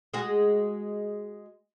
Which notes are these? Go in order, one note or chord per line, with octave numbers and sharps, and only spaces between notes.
G#3 F#4 G#4